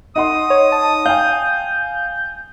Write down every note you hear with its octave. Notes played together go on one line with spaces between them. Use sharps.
D#4 F#5 C6 D#6
C#5
A5
F5 G5 G#5 G6